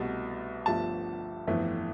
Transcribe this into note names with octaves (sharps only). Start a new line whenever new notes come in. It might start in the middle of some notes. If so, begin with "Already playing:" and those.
Already playing: C2 B2 A3
G1 G2 F3 A3 A5
G1 F2 E3 A3